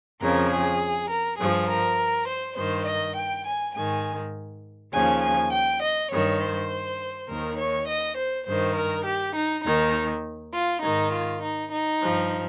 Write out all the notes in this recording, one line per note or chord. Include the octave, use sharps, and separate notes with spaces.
F2 C#3 F3 A#4
G#4
A#4
G2 F3 G#4
A#4
C5
G2 D#3 C5
D#5
G5
G#5
G#2 D#3 G#5
D#2 C#3 F3 G#5
G#5
G5
D#5
G2 D#3 C#5
C5
D#2 D#3 A#4
C#5
D#5
C5
G2 D#3 C5
A#4
G4
D#4
D#2 D#3 D#4
F4
G#2 D#3 D#4
F4
D#4
D#4
G2 F3